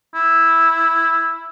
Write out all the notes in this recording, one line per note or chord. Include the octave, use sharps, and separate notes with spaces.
E4